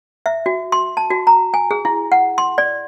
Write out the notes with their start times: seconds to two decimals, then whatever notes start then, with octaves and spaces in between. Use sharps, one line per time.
0.26 E5
0.46 F#4
0.72 C6
0.97 A5
1.11 F#4
1.27 A#5
1.54 G#5
1.71 G#4
1.85 E4
2.12 F#5
2.38 C6
2.58 D5